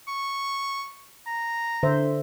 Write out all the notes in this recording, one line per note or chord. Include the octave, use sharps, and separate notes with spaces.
C#6
A#5
D3 C5 E5